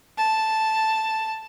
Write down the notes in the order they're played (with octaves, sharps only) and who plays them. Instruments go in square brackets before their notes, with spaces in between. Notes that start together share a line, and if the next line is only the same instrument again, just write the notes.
[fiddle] A5